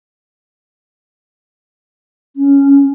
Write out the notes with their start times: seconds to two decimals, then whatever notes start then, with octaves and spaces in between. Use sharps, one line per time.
2.36 C#4